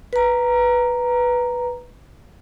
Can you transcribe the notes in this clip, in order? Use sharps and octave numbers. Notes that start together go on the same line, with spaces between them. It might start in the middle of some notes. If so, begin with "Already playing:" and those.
B4 A#5